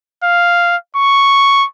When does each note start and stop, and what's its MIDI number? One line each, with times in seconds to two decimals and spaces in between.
0.24 0.76 77
0.97 1.66 85